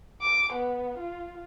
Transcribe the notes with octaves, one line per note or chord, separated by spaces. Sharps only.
D6
B3
F4